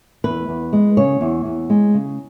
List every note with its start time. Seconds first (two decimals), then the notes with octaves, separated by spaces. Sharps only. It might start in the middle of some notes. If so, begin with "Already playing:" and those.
0.24 E2 B4
0.49 E2
0.73 G#3
0.97 C#3 C#5
1.21 E2
1.45 E2
1.70 G#3
1.94 C#3